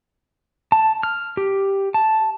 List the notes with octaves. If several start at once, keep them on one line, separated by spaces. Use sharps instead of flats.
A5
F6
G4
A5